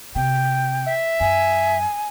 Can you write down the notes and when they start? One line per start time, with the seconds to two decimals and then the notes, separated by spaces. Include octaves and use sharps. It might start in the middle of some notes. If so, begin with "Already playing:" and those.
0.15 C3 G5
0.86 E5
1.20 F#2 G#5